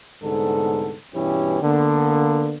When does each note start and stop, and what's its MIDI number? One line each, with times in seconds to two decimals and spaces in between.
0.22 0.95 36
0.22 0.95 44
0.22 0.95 50
0.22 0.95 59
0.22 0.95 69
1.14 1.61 43
1.14 1.61 47
1.14 1.61 52
1.14 1.61 61
1.14 1.61 64
1.14 1.61 67
1.62 2.57 50
1.62 2.57 58
1.62 2.57 59